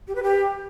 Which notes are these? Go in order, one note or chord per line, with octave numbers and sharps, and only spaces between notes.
G4
B4
G4